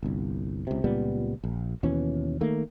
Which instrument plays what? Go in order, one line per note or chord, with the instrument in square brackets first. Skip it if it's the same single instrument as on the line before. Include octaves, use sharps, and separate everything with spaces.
[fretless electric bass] G1 C2
C#2 C3
C#2 A#2 G3 B3
A#1
D#2 B2 E3 C#4
D#3 A3 A#3